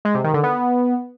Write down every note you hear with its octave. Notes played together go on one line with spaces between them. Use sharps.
G#3
C3
D#3
D3
B3